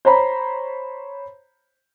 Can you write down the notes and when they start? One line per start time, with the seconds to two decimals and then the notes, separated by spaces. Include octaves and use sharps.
0.05 C5 C#5 A#5 B5